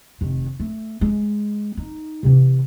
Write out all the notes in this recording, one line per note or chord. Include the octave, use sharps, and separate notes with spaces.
F1 D#3
A3
G#3
D#4
C3 E3